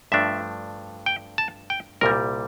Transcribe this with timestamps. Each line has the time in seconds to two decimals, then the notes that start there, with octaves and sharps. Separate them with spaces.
0.12 G2 F3 A3 D4 E5
1.06 G5
1.38 A5
1.70 G5
2.01 C2 A#2 G3 A#4